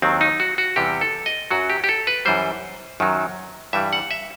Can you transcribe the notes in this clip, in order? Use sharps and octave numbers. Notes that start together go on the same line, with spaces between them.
D#2 D#3 F#3 C4
D#4
F#4
F#4
E2 C3 E3 G3 G4
A4
D#5
F#2 F#3 F#4
G4
G4
A4
B4
F#2 E3 G3 C5
F#2 D#3 F#3
G2 E3 G3 E5
F#5
E5